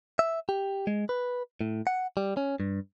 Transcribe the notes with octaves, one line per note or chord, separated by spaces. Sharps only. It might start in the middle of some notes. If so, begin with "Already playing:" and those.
E5
G4
G#3
B4
A2
F#5
G3
C#4
G2